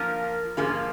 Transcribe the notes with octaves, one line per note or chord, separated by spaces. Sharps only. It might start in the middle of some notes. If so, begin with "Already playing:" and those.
Already playing: F3 A#3 F4 A#4
G#2 F3 A#3 F4 G#4